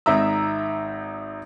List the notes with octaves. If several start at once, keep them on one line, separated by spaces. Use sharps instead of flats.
G#1 D#4 E5 A#5 E6